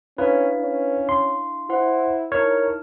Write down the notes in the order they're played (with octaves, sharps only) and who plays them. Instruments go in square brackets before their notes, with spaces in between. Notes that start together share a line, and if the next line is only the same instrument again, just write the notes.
[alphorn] C#4 [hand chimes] D4 E4 F5 [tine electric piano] B4
[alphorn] C#4
[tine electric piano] C6
[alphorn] E4 [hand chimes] C5 F#5
[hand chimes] D#4 E4 F6 [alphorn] A#4 [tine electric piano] C#5